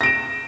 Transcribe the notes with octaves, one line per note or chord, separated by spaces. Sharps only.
A#6 D7 E7